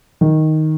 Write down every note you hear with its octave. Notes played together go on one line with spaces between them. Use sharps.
D#3